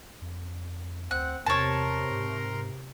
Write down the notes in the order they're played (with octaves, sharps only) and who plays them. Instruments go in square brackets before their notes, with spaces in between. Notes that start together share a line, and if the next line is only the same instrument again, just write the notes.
[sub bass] F2
[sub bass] D2 [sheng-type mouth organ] C4 F#5 [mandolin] F#6
[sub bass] E2 [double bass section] C3 [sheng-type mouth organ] A#4 A#5 C6 [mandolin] C#5 A5
[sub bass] G#2